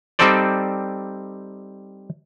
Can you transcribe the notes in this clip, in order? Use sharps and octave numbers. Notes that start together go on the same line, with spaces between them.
G3 C4 D#4 A4 C5 D5